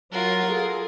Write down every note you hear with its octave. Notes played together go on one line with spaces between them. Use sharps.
F#3 F4 A#4 F#5
G#4 A4